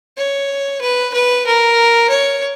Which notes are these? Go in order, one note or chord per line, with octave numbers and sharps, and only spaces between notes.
C#5
B4
B4
A#4
C#5